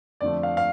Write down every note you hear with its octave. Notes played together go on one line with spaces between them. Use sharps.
F2 D3 F3 A3 D5
F5
F5